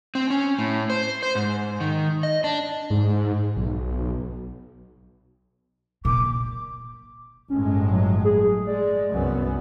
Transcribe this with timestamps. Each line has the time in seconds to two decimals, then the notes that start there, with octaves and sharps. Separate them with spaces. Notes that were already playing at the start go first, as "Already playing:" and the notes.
0.15 C4
0.30 C#4
0.58 A2
0.90 C5
1.23 C5
1.35 G#2
1.80 D#3
2.23 D#5
2.44 D4
2.90 G#2
3.57 B1
6.05 A#2 D6
7.50 G1 A2 G#3 C#4
7.91 F#3
8.24 G#4
8.67 G#3 D5
9.11 C2 F#2 B3